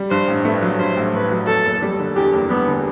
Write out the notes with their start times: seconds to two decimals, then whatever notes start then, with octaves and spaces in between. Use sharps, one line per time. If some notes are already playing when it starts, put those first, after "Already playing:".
Already playing: G3
0.10 G2 C5
0.28 A1
0.45 A3 B4
0.62 F#3
0.79 G2 C5
0.97 A1
1.14 A3 B4
1.30 F#3
1.47 E2 A4
1.65 F#1
1.82 G3
1.99 D3
2.16 E2 G4
2.33 F#1
2.50 G3 B3
2.67 D3